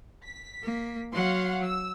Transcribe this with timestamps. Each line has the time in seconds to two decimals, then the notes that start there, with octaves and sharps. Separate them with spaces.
0.23 B6
0.63 A#3
1.13 F#3 F5 F#5 C6
1.64 E6